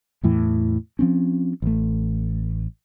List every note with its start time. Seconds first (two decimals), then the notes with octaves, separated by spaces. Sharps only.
0.23 E2 A2 E3
0.99 F3 C4 C#4
1.62 A1 A3